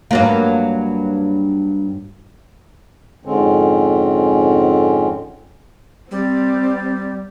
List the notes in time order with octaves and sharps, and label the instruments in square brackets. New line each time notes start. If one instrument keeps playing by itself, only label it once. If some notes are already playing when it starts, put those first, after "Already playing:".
[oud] G2 F#3 A#3
[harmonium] F2 G#2 D3 G#3 C4 C#4
[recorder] G3 [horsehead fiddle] C4